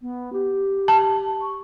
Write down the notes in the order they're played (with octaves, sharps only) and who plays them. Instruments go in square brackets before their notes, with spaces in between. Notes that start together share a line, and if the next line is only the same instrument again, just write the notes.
[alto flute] B3
G4
[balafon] A5
[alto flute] C#6